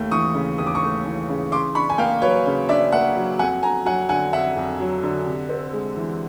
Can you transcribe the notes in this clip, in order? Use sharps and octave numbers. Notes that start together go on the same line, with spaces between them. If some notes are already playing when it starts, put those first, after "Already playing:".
Already playing: D#2 A3
E3 C#6 D#6
C#3
D#2 D#6
D6
C#6 D#6
A3
E3
C#3
C#3 C6 D6
D4 B5 C#6
G#5
A#3 F5 G5
F#3 B4 C#5
C#3
D4 D5 E5
A#3 E5 F#5
F#3
F2 F#5 G#5
F2 G#5 A#5
F#3 F#5 G#5
D3 F#5 G#5
F2 E5 F#5
F2
F#3
D3
C3
C4
G#3
E3